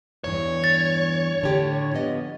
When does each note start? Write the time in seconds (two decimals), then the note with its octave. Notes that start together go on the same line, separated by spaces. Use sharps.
0.24 E2 G2 E3 C#5
0.64 A6
1.41 A2 D3 G4
1.94 F3 B3 D#5